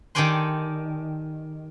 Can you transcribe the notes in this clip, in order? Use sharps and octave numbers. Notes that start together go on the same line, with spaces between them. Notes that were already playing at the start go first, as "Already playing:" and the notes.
D#3 G4 A4 D5 G#5 C6